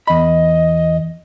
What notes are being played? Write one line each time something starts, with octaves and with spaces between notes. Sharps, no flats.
E2 D#5 B5